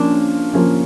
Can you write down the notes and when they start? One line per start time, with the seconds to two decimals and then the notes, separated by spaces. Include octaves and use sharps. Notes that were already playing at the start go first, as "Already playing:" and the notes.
Already playing: F3 A#3 C#4 D4
0.54 F3 A#3 C#4